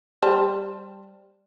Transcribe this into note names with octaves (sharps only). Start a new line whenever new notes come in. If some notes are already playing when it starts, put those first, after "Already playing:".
G3 C5 A5